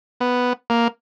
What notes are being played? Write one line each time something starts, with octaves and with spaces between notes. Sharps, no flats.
B3
A#3